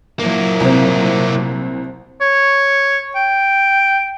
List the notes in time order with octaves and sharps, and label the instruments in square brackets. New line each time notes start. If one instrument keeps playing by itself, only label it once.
[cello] A#2 F#3 [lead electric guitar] A#3 E4
[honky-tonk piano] C2 C4
[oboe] C#5
G5